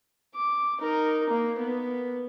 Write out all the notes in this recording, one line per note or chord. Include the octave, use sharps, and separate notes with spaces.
D6
D#4 A#4
A#3
B3